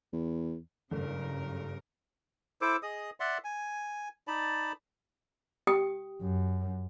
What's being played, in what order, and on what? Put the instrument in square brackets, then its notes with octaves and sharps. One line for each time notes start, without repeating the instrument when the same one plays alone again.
[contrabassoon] E2
[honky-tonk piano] F#1 A3 [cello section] G2 C#3 A#4
[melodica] E4 A4 C5 D6
G#4 D#5 D#6
D5 E5 F#5 C6
G#5
D#4 D5 A5 B5
[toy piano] G4 G5 D#6
[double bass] F#2